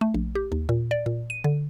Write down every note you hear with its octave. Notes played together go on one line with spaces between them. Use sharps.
A3
A#1
G4
D#2
A#2
D5
A#2
D#7
D3